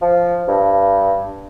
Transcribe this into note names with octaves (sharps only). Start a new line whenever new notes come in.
F3
G2